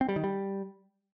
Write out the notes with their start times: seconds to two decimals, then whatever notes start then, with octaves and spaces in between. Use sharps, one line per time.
0.01 C4
0.08 G3
0.16 D#3
0.24 G3